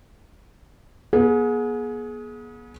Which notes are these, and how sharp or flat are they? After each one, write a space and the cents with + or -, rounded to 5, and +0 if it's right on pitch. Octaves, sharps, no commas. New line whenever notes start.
B3 -40 G#4 +20